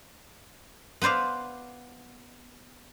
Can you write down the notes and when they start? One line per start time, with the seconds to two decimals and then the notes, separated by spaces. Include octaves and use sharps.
1.02 B3 B4 C5 D5 F5